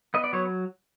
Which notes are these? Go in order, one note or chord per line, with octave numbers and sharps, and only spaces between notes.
B3 D#5
D5
F#3 C#5